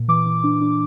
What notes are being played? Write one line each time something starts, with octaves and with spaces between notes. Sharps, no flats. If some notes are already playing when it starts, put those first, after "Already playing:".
Already playing: A#2
E3 D6
E3
D4
D4